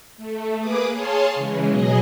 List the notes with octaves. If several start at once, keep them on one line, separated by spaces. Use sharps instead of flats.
A3
A#3 G#4 B4 D6 D#6
G#4 C#5 F5 A5 C6
C#3 E3 G#3
B2 F#3 G#4 D#5